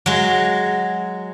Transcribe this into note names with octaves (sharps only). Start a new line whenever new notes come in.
F#3 G#3